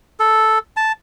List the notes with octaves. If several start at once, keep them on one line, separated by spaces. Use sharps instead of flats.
A4
A5